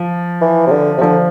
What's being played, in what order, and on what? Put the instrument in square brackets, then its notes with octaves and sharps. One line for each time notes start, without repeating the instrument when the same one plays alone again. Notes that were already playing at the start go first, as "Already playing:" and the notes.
Already playing: [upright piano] F3
[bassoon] E3
C3
D3
C3
[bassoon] D3 [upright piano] F3